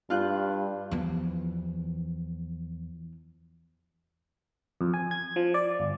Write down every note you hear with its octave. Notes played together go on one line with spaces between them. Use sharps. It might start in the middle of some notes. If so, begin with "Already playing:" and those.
G2 F4 F#6 G6
E2 E3 F3 B3
F2
G#5
G#6
F3
D5
G1